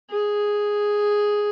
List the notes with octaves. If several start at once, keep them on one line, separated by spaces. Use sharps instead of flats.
G#4